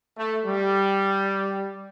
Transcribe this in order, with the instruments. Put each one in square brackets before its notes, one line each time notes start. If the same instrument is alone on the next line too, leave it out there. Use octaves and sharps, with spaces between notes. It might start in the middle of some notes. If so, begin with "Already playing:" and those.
[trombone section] A3
G3